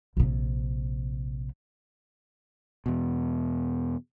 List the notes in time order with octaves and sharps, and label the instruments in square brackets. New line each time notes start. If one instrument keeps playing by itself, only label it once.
[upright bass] A#1 C3
[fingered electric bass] E2 B2